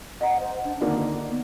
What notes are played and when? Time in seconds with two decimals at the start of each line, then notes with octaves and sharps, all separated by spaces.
0.21 D#5 F#5 A#5
0.39 C5
0.64 D4
0.81 D3 D#3 A#3 D#4
1.29 B3